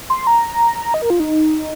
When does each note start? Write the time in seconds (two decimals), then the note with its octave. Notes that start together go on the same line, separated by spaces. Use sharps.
0.10 C6
0.27 A#5
0.94 D#5
1.02 A#4
1.10 F4
1.20 D#4